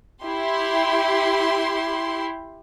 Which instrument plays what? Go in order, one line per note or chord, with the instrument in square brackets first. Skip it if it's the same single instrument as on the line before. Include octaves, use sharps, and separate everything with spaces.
[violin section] E4 G4 C6